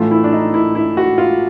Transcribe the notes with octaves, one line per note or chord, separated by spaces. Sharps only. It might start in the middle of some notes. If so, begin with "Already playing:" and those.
Already playing: A2 E3 A3 F4
E4
D4
D#4
E4
E4
F#4
F4